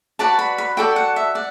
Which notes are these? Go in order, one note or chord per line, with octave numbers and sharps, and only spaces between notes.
F#4 B4 D5 A5
B5
B5
F#4 A4 D5 G5
F#5
E5
D5 F#5